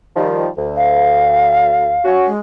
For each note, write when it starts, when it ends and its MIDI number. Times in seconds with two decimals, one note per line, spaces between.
0.16 0.47 51
0.16 0.47 53
0.16 0.47 55
0.57 1.97 38
0.76 2.07 77
2.05 2.28 61
2.05 2.28 66
2.26 2.38 56